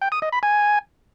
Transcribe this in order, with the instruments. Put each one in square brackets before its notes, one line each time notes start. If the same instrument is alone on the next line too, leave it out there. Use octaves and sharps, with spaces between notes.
[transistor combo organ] G5
D#6
D#5
B5
G#5